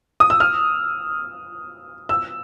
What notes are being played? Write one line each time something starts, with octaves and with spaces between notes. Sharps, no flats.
D#6
E6
F6
E6